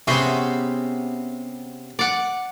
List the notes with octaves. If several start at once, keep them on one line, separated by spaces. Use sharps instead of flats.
C3 B3 C#4 G#4 C5
D5 F#5